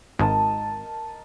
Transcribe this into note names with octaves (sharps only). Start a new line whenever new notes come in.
G#1 A#4 D#5 A5